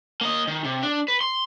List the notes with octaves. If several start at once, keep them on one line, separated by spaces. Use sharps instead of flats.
A#3 D#5
D#3
C3
D4
B4
C6